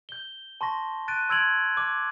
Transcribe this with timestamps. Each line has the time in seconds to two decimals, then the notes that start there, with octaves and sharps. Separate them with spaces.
0.09 G6 G7
0.61 A5 C6 C#6 A#6
1.08 F#6 A6 D7 D#7
1.29 C6 E6 G#6 D7 F7 F#7
1.77 D6